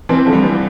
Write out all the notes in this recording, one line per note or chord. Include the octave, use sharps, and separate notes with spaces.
C3 E3 C4
D3 F3
G3
C3 E3